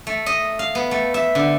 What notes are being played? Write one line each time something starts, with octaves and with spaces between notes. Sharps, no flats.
A3
D#5
F5
B3
A3
E5
D3